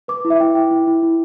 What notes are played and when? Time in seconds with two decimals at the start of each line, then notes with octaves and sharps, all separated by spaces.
0.08 B4 D6
0.25 E4
0.30 E5
0.40 E4 G5
0.55 E4 G5
0.71 E4
0.87 E4
1.03 E4